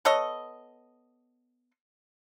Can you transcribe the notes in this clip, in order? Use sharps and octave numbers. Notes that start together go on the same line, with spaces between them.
B3 A4 C#5 D#5